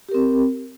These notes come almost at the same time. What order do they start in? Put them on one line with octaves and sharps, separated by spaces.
G4 A#4 C4